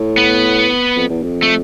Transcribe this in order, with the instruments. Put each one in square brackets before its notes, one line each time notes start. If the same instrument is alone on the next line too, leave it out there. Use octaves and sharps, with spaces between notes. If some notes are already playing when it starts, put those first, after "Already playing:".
Already playing: [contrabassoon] A2
[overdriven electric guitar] B3
[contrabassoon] F2
E2
F2
[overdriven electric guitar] A3